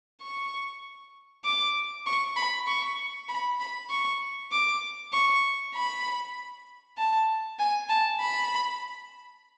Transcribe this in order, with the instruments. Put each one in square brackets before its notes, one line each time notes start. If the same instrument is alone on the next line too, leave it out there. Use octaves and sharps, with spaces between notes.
[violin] C#6
D6
C#6
B5
C#6
B5
B5
C#6
D6
C#6
B5
A5
G#5
A5
B5